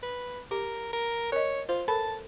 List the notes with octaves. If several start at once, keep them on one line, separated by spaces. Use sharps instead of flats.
B4
G4 A#4
A#4
A#4 C#5 D#5
F4 C5
A4 A#4 A5 B5